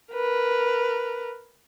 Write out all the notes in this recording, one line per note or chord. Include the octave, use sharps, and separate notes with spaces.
A#4 B4